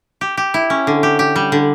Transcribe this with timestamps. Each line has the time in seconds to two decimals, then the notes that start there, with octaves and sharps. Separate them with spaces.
0.21 G4
0.37 G4
0.54 E4
0.70 C#4
0.87 D3
1.03 G4
1.19 G4
1.36 G3
1.52 D3